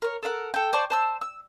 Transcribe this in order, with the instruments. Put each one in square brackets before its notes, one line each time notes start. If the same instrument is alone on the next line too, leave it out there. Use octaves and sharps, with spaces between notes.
[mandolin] A#4 C#5
A4 A#4 F5 F#5
A4 G5
C5 D5 A5 C#6
C5 A5 E6
E6